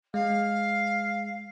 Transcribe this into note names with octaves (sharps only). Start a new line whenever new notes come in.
G#3 F5